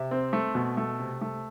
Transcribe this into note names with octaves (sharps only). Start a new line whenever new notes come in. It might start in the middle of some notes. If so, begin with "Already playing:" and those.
Already playing: C3 E5
C4
A3
B2
A3
C3
A3